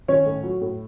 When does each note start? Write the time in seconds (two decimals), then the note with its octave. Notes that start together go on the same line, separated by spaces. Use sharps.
0.08 D#3 C#4 C#5
0.26 A2
0.43 F#3
0.61 A2